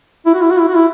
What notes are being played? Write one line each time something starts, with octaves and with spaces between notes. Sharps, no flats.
E4
F#4
E4
F#4
E4
F#4
E4